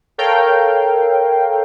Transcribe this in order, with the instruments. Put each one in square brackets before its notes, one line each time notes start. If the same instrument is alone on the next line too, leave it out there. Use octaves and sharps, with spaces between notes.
[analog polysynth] A4 A#4 C#5 F5 G5